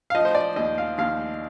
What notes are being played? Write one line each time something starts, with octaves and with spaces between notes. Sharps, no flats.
F5
F3 D#5
C5
D5
D#2 D#5
F5
D#2 F5